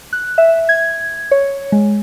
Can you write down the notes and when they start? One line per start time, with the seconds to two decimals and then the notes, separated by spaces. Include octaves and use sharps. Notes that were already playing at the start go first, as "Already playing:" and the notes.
0.13 F#6
0.38 E5
0.69 G#6
1.31 C#5
1.72 G#3